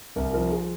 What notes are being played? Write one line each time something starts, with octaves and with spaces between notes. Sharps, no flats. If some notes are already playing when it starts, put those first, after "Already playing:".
C2 A#4
F3 A#4
G#4